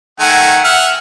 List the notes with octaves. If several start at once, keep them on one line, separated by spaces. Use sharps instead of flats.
D#3 A3 F#5 G#5
E5 F#5 F6